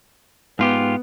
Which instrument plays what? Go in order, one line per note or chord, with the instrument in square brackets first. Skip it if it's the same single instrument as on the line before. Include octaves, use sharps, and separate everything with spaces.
[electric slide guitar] G#2 F4 G4 [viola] B3